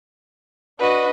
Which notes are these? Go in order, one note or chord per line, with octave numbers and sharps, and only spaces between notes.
D4 F#4 B4 D#5